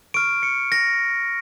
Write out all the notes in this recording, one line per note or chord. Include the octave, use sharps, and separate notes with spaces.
C#6 F6 D7
C#7
A#6